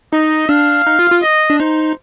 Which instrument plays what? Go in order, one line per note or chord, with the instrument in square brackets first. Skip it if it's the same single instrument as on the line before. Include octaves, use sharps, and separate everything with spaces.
[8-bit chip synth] D#4 [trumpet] D#5
[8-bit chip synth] D4 [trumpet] F5
[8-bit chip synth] D#4
F4
F4
[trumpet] D#5
[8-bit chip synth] D4
[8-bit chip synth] D#4 [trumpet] C5